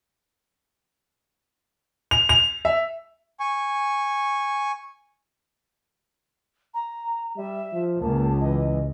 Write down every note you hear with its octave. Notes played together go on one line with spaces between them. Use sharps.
F7
F7
E5
G#5 C#6
A#5
G3 E5
F3
C#2 A#3 A5
E3 D#5